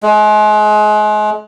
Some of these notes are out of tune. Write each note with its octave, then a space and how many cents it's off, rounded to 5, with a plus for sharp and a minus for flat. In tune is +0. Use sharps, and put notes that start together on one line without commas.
G#3 +35